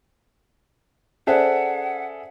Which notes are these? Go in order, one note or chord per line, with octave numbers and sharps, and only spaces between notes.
C#4 G#4 A4 C5 D5 E5 F#5